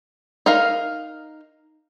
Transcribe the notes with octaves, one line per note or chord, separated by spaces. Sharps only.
D#4 A#4 F5